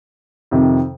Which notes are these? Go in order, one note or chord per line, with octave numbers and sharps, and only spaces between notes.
F2 C3 D#3